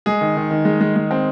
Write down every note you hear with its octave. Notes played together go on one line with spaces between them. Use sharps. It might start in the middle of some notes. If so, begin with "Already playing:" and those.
G#3 G#4
D#3
D#3
D#3
G#3
G#3
G#3
C4